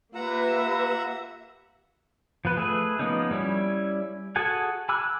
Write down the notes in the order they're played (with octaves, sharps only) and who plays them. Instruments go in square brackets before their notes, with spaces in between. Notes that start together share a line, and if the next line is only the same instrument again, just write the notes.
[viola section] A#3 G4 E5 [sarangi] F4 [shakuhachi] B4 [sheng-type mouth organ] F#5 A#5
[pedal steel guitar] F3 B3 B4
A3 G#4 B4 E5
F3 A#3 B3 C#4 D#4
G3 C#4 E4
F#4 G#4 A4 F#5 G#5
G#5 B5 D6 E6 F#6